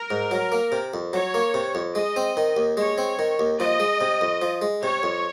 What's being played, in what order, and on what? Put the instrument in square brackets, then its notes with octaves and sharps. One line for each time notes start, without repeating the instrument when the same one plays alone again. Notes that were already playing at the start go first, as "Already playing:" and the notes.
Already playing: [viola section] A#4
[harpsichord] G#2
F#3
A#3
C3
F2
[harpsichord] F#3 [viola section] C#5
[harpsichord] A#3
C3
F2
[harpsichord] G#3 [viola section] D#5
[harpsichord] C4
D#3
D#2
[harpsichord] G#3 [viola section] C#5
[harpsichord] C4
D#3
D#2
[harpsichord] F3 [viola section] D#5
[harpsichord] G#3
C3
F2
F3
G#3
[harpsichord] C3 [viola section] C#5
[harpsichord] F2